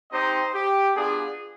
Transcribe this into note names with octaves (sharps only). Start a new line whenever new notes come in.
C4 D#4 G4 C5 D#5
G4
B3 D4 F4 G#4